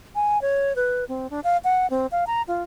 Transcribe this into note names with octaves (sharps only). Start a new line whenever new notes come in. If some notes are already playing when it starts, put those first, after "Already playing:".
G#5
C#5
B4
C4
D4
F5
F#5
C4
F5
A#5
F4